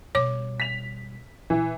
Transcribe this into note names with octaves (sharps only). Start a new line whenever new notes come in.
B2 G3 C#5 D6
B6 F7
A#2 E3